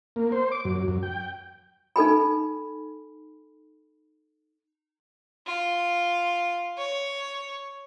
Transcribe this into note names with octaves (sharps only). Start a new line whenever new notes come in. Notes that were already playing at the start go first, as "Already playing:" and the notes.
A#3
C5
D6
F#2
F#2
G5
D#4 A4 G#5 B5
F4
C#5